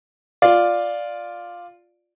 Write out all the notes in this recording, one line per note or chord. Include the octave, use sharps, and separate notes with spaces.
F4 D5